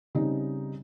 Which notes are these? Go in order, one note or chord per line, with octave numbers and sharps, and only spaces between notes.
C#3 G3 C4 D#4